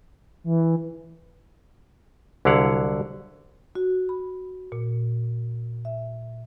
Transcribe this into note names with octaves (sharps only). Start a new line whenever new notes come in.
E3
C2 D3 F#3 E4 F5 F#5
F#4
B5
A#2
E5